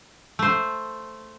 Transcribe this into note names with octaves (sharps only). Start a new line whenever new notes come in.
A3 C5